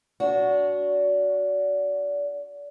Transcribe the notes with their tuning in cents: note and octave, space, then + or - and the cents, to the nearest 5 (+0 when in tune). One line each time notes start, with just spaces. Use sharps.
D4 -30 F#4 +0